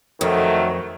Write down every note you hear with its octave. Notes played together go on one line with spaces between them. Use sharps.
F2 D#3 F#3 A3